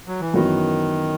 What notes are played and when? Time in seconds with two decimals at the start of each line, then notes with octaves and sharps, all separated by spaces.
0.07 F#3
0.21 E3
0.34 F#2 D#3 E3 B3 F#4